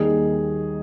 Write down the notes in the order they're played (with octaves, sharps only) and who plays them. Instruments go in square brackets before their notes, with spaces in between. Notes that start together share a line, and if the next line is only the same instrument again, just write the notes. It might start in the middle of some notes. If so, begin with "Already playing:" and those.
Already playing: [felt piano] D#2 D#3 G3 G#4